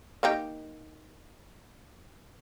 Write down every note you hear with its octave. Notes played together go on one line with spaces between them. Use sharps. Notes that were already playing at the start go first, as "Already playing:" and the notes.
A#3 D#4 G4